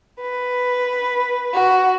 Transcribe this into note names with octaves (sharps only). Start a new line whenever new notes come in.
B4
F#4